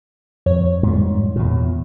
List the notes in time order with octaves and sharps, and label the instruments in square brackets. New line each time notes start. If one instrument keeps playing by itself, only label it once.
[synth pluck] F2 C#5
[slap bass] G#2 G3
E2 A#2